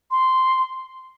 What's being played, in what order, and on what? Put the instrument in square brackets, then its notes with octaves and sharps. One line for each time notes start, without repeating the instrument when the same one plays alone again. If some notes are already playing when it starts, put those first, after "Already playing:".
[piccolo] C6